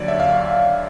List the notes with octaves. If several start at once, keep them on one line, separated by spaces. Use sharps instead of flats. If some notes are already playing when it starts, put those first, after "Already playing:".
Already playing: D#2 D3 F#3 C#5 D5
E5
F5